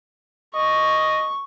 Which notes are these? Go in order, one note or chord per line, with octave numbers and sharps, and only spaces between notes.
D#5 C#6